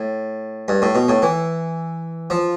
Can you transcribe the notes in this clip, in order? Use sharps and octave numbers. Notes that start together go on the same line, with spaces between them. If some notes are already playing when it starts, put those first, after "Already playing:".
Already playing: A2
G2
A2
B2
A2
E3
F3